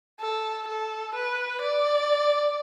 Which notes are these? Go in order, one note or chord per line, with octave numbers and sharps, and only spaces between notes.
A4
A4
B4
D5